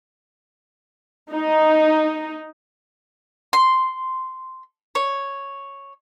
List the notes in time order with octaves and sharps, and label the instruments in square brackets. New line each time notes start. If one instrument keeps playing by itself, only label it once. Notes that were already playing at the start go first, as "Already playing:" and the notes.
[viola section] D#4
[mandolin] C6
C#5